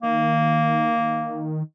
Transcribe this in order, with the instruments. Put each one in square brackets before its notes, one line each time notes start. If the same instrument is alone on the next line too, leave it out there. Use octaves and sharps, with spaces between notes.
[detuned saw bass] D#3 [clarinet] A#3